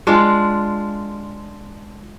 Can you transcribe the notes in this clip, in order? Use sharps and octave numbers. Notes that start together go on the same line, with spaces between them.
G#3 D4 F4